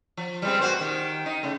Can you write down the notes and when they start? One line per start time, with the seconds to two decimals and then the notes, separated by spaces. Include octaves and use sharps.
0.17 F3
0.42 G3 G#3 C4
0.61 A#2 F#4 C5
0.81 D#3 G4
1.26 D#4
1.43 C#3 A3